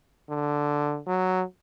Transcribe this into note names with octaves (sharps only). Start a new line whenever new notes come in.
D3
F#3